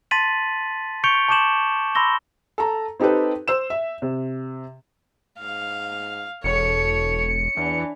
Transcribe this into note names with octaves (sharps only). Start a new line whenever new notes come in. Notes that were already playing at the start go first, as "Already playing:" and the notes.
A5 C6 A6 B6 D#7 F#7
C#6 G6 C#7 D7 F7 G7
A5 C#6 D6 G6 E7 F#7
B5 C6 E6 A#6 G7
A4 A#5
C4 D#4 G4 A4 B4
C5 E6 E7
E5
C3
G#2 F5
E1 A4 C#5 C#7
E2 E3 D4